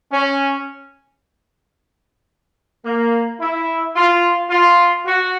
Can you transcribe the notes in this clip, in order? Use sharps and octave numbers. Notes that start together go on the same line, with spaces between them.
C#4
A#3
E4
F4
F4
F#4